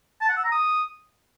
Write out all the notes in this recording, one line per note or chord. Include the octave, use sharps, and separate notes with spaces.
A5
F#5
E6
A#5
D#6